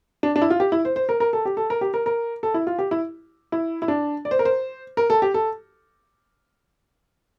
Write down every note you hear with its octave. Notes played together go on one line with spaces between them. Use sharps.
D4
D4
E4
F4
G4
E4
C5
C5
A#4
A#4
A4
G4
A4
A#4
G4
A#4
A#4
A4
E4
F4
G4
E4
E4
E4
D4
D5
C5
A#4
C5
A#4
A4
G4
A4